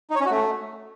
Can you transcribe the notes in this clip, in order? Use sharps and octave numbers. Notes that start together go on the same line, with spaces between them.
D#4
C#5
C#4
F#4
A3